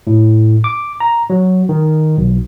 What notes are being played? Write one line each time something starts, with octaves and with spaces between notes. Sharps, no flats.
A2
D6
A#5
F#3
D#3
B1